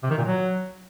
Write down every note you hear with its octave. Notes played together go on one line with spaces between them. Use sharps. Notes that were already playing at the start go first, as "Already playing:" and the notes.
C3
D#3
A#2
F#3